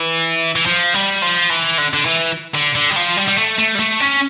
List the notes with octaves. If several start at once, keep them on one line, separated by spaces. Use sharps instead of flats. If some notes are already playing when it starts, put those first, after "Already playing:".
Already playing: E3
E3
F3
G3
F3
E3
D3
D3
E3
D3
D3
G3
F3
G3
G3
A3
A3
G3
A3
C#4